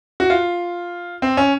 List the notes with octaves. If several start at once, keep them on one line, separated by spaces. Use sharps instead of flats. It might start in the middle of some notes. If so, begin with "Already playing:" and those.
F#4
F4
C4
C#4